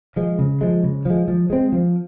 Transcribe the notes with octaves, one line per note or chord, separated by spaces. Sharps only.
F3 G#3
C#3
F3 G#3
C#3
F3 G#3
F3
G#3 C4
F3